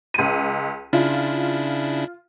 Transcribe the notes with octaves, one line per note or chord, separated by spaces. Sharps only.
C#2 D#7
C#3 D4 E4 F4